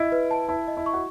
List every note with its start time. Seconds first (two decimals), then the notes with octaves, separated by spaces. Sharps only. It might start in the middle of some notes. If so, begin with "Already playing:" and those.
Already playing: E4 D#5
0.12 B4
0.31 A5
0.48 E4 A5
0.68 D#5
0.77 E4
0.86 C#6
0.94 F#4